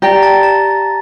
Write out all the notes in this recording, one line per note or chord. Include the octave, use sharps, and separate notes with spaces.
G4 D5 G5 A#5 A#6
A5 A6
A5 A6